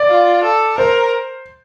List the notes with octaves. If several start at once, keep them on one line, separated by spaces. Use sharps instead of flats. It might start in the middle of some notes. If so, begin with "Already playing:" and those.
Already playing: D5
F4
A4
A#4 C5